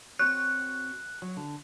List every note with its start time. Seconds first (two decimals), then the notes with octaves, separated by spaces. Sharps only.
0.19 C4 F#4 C#5 F#6
1.22 F#3
1.37 D3